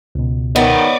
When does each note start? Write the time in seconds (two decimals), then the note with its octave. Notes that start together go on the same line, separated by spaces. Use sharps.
0.15 C#2 B2
0.56 D#3 B3 D5 D#5